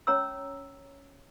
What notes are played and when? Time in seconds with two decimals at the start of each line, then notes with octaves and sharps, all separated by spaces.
0.07 C#4 C#5 A#5 E6